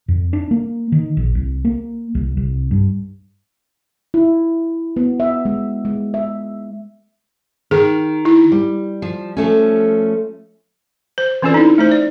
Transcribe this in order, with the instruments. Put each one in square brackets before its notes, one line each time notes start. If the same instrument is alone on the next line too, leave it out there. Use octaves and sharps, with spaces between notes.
[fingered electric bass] F2
D4
A#3
D#3
A#1
C2
A#3
C2
C2
G2
[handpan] E4
B3
E5
G#3
G#3
E5
[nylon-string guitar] D#3 [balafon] G#4
[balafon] E4
[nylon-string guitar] G3
[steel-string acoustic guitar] F3
F3 A3 C#4
[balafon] C5
E3 C4 C#4 F4 A4 D5
D#4 E4
A3 D#4 C5
D5